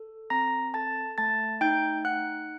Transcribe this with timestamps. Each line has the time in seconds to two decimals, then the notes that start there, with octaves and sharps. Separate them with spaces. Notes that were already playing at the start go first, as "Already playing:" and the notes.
Already playing: A4
0.30 C4 A#5 A#6
0.74 A4 A5 A6
1.18 A3 A5 A6
1.61 D#4 G5 G6
2.05 D#4 F#5 F#6